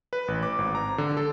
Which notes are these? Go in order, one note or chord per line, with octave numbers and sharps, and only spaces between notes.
B4
A1
D6
G#1
A#5
D3
A4